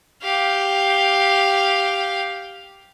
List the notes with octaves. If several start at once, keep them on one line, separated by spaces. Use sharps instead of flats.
G4 F5